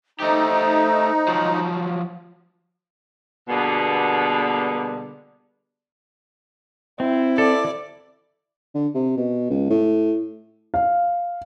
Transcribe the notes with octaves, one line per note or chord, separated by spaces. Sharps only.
A3 D#4 G4 C5
F3 F#3
B2 D3 G3 A#3 B3 G#4
C4 E4
A4 D5
D3
C3
B2
C#2
A2
F5